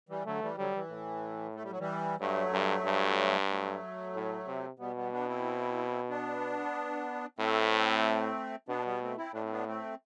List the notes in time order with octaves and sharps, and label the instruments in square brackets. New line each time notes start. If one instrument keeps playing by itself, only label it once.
[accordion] E3 G3
[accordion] D3 F#3 [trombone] A3
[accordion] E3 G3
[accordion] D3 F#3 [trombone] G3
[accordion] E3
[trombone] A2
[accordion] A3
G3
F#3
E3 G3
[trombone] G2 [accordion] F#3 A3
[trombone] G2
G2
[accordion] F#3 A3
[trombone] A2
C3
[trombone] B2 [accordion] G3 B3
[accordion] G3 B3
B3 D4
C4 E4
B3 D4
[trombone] A2 [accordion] A3 C4
[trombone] B2 [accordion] B3 D4
[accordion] G3 B3
A3 C4
C4 E4
[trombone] A2 [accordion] D4
[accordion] C4
B3 D4
A3 C4